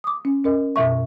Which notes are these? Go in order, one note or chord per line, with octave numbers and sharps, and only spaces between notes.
D6 D#6
C#4
C#4 A#4 D#5
F#2 B2 E5 C#6